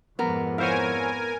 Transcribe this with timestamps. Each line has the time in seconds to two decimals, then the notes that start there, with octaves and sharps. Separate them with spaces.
0.19 F2 G#2 B3 A#4
0.58 B3 E4 A#4 C5 C#5 F5 G#5